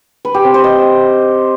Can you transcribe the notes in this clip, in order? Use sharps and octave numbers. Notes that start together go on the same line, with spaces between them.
B4
G4
C4
C5
D#5